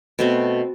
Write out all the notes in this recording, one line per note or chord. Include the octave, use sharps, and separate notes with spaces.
B2 A3 C4